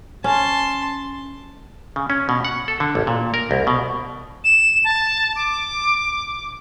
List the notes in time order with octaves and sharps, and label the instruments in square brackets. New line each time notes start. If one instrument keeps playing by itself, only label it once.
[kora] C#4 [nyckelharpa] A5 C6
[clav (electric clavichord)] C#3
C#4
B2
F#5
A4
D3
A1
A#2
A#4
C2
B2
[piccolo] E7
A5
D6